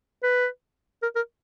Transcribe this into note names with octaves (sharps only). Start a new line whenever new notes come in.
B4
A#4
A#4